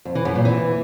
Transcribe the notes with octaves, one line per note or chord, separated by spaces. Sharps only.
F2
E3
F#2
A#2
E3